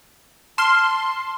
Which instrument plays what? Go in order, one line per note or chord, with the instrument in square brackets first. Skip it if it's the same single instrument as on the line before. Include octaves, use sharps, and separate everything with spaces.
[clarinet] A5 [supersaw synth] C6 [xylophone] F6 E7